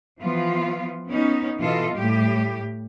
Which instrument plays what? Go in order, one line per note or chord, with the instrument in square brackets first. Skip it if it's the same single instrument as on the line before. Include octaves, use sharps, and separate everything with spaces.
[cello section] E3 F3 B3 F4
B3 C#4 D#4
B2 E3 F4 A4 D#5
A2 G3 G4